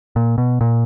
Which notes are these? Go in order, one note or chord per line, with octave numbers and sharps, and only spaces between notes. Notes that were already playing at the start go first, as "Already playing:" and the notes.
A#2
B2
A#2